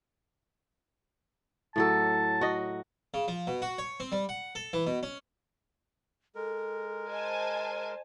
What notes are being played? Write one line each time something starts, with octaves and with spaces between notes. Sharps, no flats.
A2 F#3 A4 A5
F#4 D#5
C#3
F3
B2
F#4
C#5
C4
G3
F#5
A4
E3
B2
C#4
G#3 A4 A#4
C5 D#5 G#5 A5